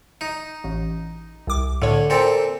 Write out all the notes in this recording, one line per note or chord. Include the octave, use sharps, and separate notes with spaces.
D#4
A1
C2 D6
A2 D3 C#5
A#2 C4 A4